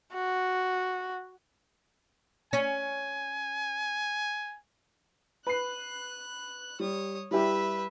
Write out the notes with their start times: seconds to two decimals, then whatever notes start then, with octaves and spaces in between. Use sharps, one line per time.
0.14 F#4
2.53 C#4 G#5
5.47 B4 F#6 C7
6.80 G3 C#5 D#6
7.31 G3 E4 G4 B4 E5